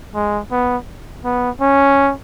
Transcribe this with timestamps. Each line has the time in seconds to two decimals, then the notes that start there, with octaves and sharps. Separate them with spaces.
0.15 G#3
0.51 B3
1.25 B3
1.61 C#4